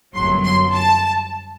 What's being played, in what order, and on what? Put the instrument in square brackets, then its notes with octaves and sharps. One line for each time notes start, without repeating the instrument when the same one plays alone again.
[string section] G1 F#2 F#3 C6
C6
A5